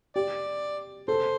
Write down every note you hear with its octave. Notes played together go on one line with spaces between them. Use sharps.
G4 D5
A4 C5